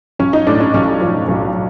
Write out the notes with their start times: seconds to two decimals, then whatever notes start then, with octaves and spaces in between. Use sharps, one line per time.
0.19 B1 C#4
0.33 D#4
0.47 A2 D4
0.60 C#4
0.74 B1 C#4
1.01 F3
1.28 B1